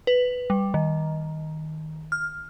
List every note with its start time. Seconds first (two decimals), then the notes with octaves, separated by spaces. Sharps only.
0.07 B4
0.50 G3
0.74 D#3
2.12 F6